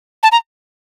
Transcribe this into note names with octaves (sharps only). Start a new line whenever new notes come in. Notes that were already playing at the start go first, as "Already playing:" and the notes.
A5
A#5